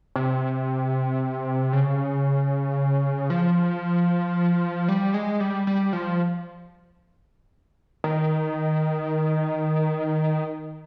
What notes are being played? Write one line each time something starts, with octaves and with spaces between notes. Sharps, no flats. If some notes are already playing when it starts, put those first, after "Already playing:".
C3
C#3
F3
G3
G#3
G3
G3
F3
D#3